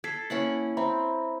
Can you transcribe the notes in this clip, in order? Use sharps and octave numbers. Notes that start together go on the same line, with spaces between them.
A4 G#6 B6 C7
A#3 C#4 E4 F#5
C4 E5 A#5 B5